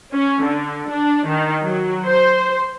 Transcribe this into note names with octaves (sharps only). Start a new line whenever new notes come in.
C#4
D3
D4
D#3
F#3
C5